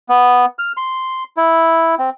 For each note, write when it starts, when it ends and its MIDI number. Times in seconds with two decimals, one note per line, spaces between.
0.09 0.45 59
0.59 0.72 89
0.77 1.23 84
1.37 1.95 64
1.99 2.10 60